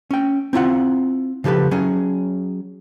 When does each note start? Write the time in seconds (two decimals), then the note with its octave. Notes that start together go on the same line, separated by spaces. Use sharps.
0.11 C#4 G5
0.53 C4 E4 F4 F#5
1.44 C#3 F3 G4 A4 B4
1.71 F#3 C#4 G#4